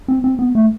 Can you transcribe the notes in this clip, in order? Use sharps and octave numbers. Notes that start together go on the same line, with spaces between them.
C4
C4
B3
A3